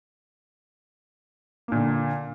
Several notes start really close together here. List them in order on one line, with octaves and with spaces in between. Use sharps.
A#3 A#2 D3